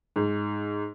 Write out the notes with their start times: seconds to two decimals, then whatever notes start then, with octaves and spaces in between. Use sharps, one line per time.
0.16 G#2